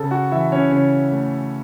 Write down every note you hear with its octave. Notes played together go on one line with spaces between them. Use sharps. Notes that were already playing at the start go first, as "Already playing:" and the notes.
Already playing: C#3 A4 A5
F#4 F#5
E3 E4 E5
C#4 C#5
C#3 C#4 C#5
A3